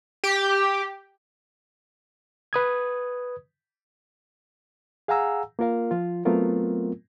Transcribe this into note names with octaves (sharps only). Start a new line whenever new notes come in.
G4
B4 D#6 G#6
G#4 F5 F#5 G#5 A#5 E6
A#3 F4 A#4 F5
F3 F4
F#3 A3 B3 C4 F4 A#4